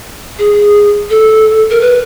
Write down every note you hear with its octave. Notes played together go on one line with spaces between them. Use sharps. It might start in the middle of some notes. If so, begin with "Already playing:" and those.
G#4
A4
A#4
B4